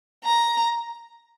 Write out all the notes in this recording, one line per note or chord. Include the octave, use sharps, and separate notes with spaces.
A#5